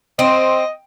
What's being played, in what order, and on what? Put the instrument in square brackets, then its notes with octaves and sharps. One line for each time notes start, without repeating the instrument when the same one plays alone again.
[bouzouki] C4 [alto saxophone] D#5